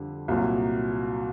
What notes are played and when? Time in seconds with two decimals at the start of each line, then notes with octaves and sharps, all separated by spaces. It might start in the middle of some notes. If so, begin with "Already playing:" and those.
Already playing: F2 D3 G3
0.28 C2 A#2 F#3